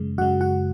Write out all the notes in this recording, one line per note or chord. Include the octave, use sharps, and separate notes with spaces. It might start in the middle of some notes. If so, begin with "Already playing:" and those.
Already playing: F#2 C#3 G#3
F#2 C#3 G#3 F#4 F#5
F#4 F#5